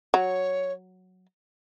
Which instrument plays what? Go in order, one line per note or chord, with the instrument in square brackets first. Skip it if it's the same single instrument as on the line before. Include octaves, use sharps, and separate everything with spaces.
[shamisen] F#3 [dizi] C#5